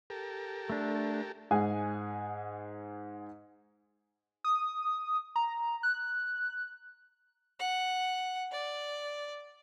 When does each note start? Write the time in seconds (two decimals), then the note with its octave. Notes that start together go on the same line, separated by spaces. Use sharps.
0.10 G4 A4 A#4
0.70 A3 D4
1.51 G#2 G#4 F#5 G#5
4.44 D#6
5.36 A#5
5.83 F#6
7.60 F#5
8.52 D5